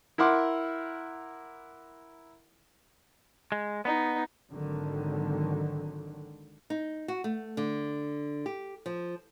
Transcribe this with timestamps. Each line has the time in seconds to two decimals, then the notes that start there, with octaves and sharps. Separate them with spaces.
0.18 E4 A#4 F#5 C6 D6
3.52 G#3
3.85 B3 D#4
4.51 G#1 D3 D#3 F#3
6.70 D#4
7.08 F#4
7.24 A3
7.57 D3
8.46 G4
8.86 F3